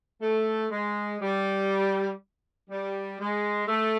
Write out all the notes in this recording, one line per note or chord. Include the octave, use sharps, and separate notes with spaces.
A3
G#3
G3
G3
G#3
A3